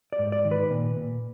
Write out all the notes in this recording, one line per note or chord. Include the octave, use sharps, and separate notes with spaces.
D5
G#2
D5
D#3
B4
A#2
A#2